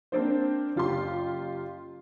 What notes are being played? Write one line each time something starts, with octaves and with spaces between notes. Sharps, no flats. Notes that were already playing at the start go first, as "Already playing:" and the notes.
A#3 C4 D4 C5
F#1 F4 G4 C6